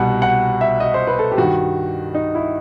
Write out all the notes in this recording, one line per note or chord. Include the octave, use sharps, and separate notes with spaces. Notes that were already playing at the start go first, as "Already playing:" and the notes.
Already playing: C2 B2 F#5
F#5
E5
D#5
C5
B4
A4
G4
G2 D#3 F#4
D#4
E4